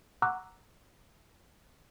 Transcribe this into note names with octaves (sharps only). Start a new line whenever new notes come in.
F#5 A#5 C#6 D6 E6 F#6